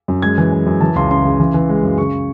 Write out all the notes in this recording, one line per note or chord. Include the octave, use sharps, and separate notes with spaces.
F#2
G#3 G#6
E3
E3
F#2
E3 A5
C#2 C6
C#3 C6
C#3
E3
E3
G#3
F#2
C#3 C#6